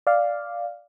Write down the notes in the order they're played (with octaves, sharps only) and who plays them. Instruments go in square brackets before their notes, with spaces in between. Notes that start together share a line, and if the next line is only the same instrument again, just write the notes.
[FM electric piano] D5 F5